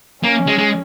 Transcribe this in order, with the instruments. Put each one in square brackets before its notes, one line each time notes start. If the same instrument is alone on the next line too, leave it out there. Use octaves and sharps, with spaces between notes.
[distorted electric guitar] A#3 [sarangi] C#4
[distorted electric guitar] G#3
G#3